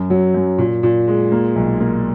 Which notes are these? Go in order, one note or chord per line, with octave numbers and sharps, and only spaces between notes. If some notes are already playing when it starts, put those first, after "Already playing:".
Already playing: F#2
F#3
F#2
A#2
A#2
G#3
A#3
B1
A#3